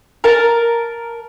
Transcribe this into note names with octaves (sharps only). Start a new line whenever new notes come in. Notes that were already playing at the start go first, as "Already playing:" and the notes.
A#4 A5